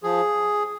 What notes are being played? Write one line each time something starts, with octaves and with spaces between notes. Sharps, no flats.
F3 G#4